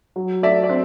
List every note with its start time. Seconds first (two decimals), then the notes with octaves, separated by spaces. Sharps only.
0.16 F#3
0.43 A3 D5 E5
0.64 D5
0.69 C4